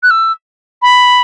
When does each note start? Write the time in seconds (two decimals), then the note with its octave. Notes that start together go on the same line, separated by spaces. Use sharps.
0.03 F#6
0.11 E6
0.82 B5